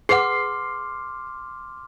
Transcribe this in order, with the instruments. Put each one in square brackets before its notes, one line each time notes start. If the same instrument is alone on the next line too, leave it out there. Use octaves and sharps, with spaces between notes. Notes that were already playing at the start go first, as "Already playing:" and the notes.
[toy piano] G#4 B4 F#5 [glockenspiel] C6 D6 F6 [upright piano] C7